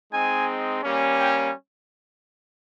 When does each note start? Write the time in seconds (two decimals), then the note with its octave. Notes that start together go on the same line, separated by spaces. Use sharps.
0.12 G#3 C4 D#4 G#5
0.82 G3 A#3 C#4
1.17 G5